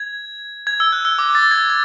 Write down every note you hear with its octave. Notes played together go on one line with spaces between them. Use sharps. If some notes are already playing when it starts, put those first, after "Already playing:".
Already playing: G#6
G#6
E6
F#6
E6
D6
A6
G#6
G#6